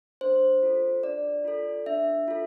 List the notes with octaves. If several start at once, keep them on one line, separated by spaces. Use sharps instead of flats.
D4 C5
F4 A4
D4 D5
F4 A4
D4 E5
F4 A4